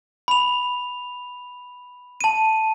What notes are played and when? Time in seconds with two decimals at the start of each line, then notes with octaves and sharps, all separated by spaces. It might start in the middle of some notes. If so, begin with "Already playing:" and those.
0.28 B5 F7
2.21 A5 D#7